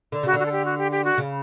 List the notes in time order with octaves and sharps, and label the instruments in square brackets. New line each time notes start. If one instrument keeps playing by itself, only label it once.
[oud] D3
[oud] C#3 [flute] F#4
[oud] D3
[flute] F#4
A4
G4
F#4
G4
G4
F#4
[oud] C#3